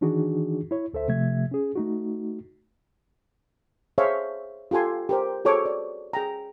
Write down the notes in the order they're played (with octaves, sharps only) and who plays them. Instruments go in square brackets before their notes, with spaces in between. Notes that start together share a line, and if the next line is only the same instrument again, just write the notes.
[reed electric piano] D#3 E3 D4 D#4 F#4 G#4
E4 C#5
D2 A4 C5 E5
C3 F3 A3 E5 G#6
C#4 G#4
A3 D#4 F#4
[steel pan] G#4 C5 C#5 E5 F5
F4 G4 A4 G#5 C6
G4 A#4 C5
F#4 G#4 A4 C5 C#5 D6
D5
G#4 G5 A#5